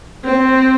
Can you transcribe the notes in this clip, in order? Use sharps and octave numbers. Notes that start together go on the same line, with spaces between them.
C4